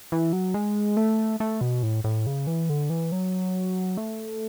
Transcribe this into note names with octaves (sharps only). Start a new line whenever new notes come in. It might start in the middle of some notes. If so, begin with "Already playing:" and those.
E3
F#3
G#3
A3
A3
B2
A2
A2
C#3
E3
D3
E3
F#3
A3